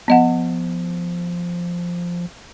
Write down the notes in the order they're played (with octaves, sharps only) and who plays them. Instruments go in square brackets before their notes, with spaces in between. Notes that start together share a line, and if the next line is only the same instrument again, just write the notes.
[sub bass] F3 [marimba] B3 D#5 F#5